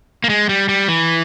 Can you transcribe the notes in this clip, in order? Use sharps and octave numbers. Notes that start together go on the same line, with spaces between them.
A#3
G#3
G3
G3
E3